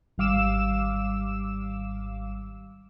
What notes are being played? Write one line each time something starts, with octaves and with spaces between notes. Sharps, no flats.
G#1 G3 F5 D6 E6 E7